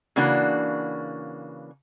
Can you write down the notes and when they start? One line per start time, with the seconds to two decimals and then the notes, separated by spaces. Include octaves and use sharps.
0.16 C#3 E3 A#3 D4 F#4